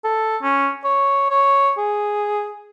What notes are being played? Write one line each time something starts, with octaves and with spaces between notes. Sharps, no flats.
A4
C#4
C#5
C#5
G#4